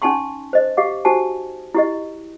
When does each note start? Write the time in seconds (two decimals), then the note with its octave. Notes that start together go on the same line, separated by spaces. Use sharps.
0.02 C#4 D#4 G#5 A5 C6 C#6
0.53 C5 D#5
0.77 G4 D#5 F5 D6
1.05 D#4 F#4 G4 C5 G#5 A5
1.75 E4 G4 D#5